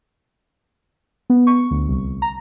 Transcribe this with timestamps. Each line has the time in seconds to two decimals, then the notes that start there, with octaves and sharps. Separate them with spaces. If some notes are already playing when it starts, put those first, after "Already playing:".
1.30 B3
1.47 C#6
1.71 D2
1.88 C2
2.22 A#5